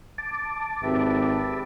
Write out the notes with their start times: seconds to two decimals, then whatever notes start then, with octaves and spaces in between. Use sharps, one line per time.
0.18 A5 D6
0.83 G#1 G4 B4 E5